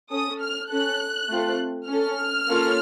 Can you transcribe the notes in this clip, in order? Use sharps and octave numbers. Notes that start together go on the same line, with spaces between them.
C#4 A4 D#6
F6
C#4 A4 F#6
A3 C4 F4 A4
C#4 A4 F6
A#3 C#4 F4 A4